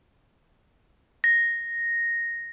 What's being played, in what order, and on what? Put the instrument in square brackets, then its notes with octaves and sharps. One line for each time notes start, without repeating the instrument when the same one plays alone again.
[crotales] A#6